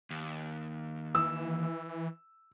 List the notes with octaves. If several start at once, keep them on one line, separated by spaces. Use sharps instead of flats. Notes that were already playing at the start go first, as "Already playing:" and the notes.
D#2
E3 E6